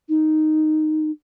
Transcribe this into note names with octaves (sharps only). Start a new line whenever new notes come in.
D#4